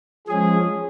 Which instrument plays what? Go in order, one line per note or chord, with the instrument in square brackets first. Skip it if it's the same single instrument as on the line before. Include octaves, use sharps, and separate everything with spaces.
[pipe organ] F3 G#3 C#4 [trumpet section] G#4